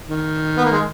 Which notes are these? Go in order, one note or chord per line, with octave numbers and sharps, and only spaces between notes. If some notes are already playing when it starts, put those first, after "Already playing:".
D#3
B3
A#3
G#3